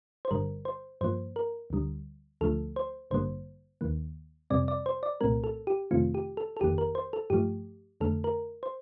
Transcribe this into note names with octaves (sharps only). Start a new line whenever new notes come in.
C5
G1 G2 D3 G3 A#4
C5
G2 F3 A#3 C5
A#4
D2 D3 G3
D2 D3 F3 A3 A4
C5
A1 G2 D3 G3 A#3 C5
D#2 D#3 A#3
F2 C3 G3 C4 D5
D5
C5
D5
C2 A#2 A3 C4 A#4
A4
G4
F2 C3 D#3 A3 C4 F4
G4
A4
A4
G1 F2 D#3 A#3 G4
A#4
C5
A4
G2 F3 A3 G4
F2 D3 A3 A4
A#4
C5